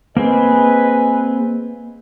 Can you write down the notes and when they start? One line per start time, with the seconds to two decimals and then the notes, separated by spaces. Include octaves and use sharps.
0.17 A#3 C4 G#4 B4 D#5 G#5